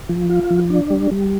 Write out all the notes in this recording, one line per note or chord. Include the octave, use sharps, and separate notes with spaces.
F3
F4
F3
D4
G3
G3